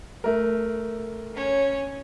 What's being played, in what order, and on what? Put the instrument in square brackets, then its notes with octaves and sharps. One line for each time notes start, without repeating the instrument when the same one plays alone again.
[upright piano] A3 A#4
[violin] C#4 C#5